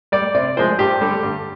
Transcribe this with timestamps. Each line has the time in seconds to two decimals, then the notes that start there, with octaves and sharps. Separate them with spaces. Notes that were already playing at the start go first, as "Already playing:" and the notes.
0.12 G3 D5
0.34 C3 D5
0.57 F3 G#3 C5
0.79 G2 G4
1.01 D3 G3
1.23 G2